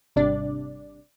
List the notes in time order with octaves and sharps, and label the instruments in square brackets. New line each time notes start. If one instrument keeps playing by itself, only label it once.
[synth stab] G#1 C3 G3 D4 D5